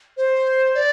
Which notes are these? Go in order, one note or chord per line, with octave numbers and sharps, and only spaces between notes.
C5
D5